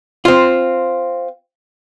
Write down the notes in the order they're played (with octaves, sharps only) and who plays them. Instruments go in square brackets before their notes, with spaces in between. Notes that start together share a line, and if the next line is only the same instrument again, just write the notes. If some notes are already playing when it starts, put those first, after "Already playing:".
[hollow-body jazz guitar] C4 F4